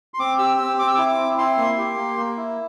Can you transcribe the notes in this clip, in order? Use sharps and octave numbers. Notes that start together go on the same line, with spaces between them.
C6
C4 D6
G4 E6
C4 E6
C4 D6
E6
E4 D6
D6
C4
E4 C6
A#3
G4
A#3
A#3
E4